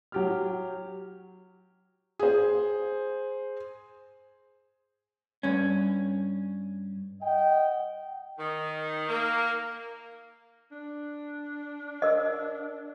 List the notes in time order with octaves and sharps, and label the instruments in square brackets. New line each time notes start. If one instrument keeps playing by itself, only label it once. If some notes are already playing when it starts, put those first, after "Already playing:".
[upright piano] F#3 G4 F6
[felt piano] G#4 C5
[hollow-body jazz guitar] G2 C#4
[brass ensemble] D#5 F#5 G5
[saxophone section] D#3
A#3
[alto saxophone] D4
[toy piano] A#4 D#5